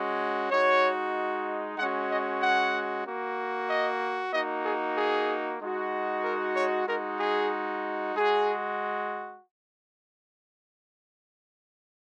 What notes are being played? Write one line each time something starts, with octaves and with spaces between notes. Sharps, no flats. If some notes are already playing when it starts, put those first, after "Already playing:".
Already playing: G#3 C#4 F#4
G#3 D#4 F#4 C#5
G#3 C#4 F#4 F#5
D#5
F#5
A#3 F#4
D#5
A#3 D#4 F#4 D#5
G#4
G#4
G#3 D#4 F#4
A#4
C#5
G#3 D#4 F#4 A#4
G#4
G#3 F#4 G#4